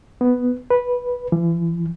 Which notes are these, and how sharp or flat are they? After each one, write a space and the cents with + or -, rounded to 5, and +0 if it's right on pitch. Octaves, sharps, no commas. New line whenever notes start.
B3 +5
B4 -10
E3 +40